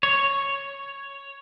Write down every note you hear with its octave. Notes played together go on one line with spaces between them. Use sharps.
C#5